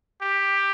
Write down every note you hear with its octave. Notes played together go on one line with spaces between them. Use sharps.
G4